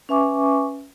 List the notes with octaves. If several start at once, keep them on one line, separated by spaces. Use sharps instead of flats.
C#4 B4 E5 G#5 C#6 D6